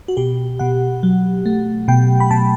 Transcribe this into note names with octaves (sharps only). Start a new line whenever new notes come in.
F#4
B2 G4
B2 F#5
F#3
A3
B2 G5
B5
B2 A5